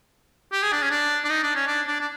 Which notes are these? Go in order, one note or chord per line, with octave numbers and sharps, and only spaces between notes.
G4
G#4
D4
C#4
D4
D4
D#4
D4
C#4
D4
D4
D4